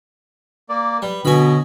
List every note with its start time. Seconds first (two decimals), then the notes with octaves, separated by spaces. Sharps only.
0.69 A#3 D5
1.02 G3 B4
1.25 B2 D3 B3 C#4 D#5 G#5 B5